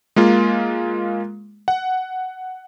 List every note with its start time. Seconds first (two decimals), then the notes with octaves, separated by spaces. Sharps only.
0.16 G#3 A#3 F4
1.68 F#5